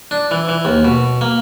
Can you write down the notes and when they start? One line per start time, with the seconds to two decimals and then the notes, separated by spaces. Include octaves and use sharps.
0.11 D4
0.31 E3
0.49 E3
0.65 D#2
0.85 B2
1.21 A#3